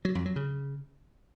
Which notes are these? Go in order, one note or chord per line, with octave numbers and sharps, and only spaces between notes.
F#3
F2
F#3
C#3